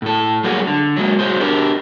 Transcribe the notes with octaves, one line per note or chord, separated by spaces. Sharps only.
A2 A4
F#3 G3 A3 A#3 F#4 G#4
D3
F#3 G#3 A#3
F#3 G#4 C5
D4 G4 A#4